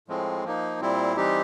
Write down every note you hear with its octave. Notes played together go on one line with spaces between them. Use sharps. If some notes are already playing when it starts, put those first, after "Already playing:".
A2 F3 G#3 C4
F3 A#3 D#4
A#2 G3 C4 E4
E3 G3 C4 D#4 G4